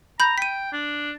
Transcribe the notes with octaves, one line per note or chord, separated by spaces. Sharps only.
A#5 B5 G6
G5 B6 D#7
D4